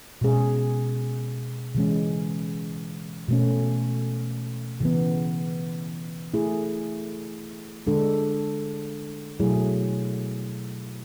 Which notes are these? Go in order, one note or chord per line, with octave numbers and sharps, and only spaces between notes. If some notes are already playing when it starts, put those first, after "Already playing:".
B2 G#3 C#4 G#4
C#3 E3 G#3 C#4
B2 A3 C#4
C#3 E3 B3
A3 E4 G#4
D3 G#3 D4 A4
B2 F#3 A3 E4 G#4